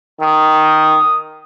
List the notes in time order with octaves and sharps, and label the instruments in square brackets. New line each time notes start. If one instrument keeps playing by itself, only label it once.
[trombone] D#3 [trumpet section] D#6